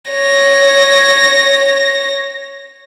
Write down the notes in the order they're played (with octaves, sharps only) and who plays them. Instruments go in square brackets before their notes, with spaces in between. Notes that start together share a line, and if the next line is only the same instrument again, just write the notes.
[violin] C#5 A#6